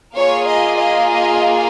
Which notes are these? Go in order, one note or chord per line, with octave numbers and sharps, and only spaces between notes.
A#3 F4 G#4 C#5
D#5
D#5
D#5